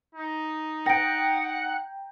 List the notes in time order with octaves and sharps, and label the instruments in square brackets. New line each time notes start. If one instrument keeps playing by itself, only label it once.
[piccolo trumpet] D#4
[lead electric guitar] F#5 [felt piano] G5 A#5 [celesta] A#6 D7